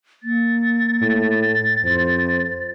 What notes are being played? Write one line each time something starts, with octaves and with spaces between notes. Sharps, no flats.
A#3 A6
A2
F2 C5